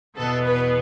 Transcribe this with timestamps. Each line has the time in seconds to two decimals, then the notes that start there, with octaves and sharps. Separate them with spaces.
0.17 E2 B2 B3 A4
0.45 B4